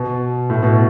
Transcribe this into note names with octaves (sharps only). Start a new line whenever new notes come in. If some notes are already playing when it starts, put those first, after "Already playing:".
Already playing: B2
A2
B2